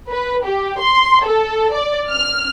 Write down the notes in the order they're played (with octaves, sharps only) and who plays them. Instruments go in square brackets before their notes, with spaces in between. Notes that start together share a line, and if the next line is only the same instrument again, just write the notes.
[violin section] B4
G4
C6
A4
D5
F6